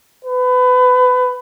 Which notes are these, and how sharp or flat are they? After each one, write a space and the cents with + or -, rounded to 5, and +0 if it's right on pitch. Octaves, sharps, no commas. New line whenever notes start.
B4 +25